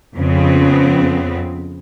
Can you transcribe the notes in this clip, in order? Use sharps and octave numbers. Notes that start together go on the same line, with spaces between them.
F2 C#3 B3 C4